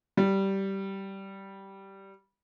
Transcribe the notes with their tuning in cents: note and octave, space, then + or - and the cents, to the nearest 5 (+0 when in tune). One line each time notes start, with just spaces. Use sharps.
G3 -10